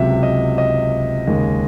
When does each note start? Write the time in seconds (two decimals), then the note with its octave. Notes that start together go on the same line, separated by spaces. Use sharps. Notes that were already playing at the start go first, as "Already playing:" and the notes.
Already playing: C#2 C3 F#3 E5
0.23 D#5
0.58 D#5
1.27 D#2 C#3 G#3